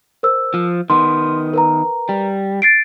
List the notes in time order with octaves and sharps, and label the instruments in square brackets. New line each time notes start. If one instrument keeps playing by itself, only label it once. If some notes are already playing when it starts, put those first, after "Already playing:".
[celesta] A#4 C5 E6
[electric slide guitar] F3
[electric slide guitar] D#3 B3 [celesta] C6
[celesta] A#4 B4 A#5
[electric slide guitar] G3
[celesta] A6 C7 D7